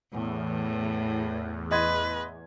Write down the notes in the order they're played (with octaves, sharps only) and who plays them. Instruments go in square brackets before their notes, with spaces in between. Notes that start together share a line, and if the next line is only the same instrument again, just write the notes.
[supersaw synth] E2 [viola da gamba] A2
[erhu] B4 [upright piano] D#5 C6 G#6